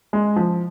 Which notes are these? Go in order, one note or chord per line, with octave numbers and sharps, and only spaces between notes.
G#3
F3